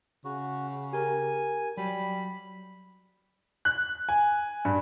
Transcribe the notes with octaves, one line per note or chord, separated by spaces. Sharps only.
C#3 F#4
G4 A#4 G#5
F#3 G3 B5
F#6
G#5
G2